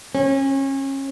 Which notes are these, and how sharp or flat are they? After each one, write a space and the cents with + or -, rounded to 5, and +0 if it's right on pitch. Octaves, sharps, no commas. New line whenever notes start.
C#4 -30